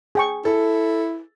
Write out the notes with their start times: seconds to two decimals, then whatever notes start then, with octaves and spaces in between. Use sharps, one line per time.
0.15 G#4 G5 C#6
0.45 E4 A4